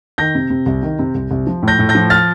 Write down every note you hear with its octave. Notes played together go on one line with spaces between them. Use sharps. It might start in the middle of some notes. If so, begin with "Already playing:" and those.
D#3 G6 A#6
C3
C3
C2
D#3
C3
C2
C2
F3
A2
G6 A#6
A2
G6 A#6
F3
F6 A6